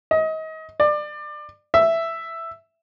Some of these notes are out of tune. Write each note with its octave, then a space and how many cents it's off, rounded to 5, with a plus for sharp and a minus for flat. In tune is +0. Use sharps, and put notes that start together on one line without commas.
D#5 +30
D5 +25
E5 +5